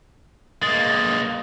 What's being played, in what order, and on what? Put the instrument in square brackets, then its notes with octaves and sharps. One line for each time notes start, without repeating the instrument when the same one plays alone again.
[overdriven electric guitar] G#3 A#3 [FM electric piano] A6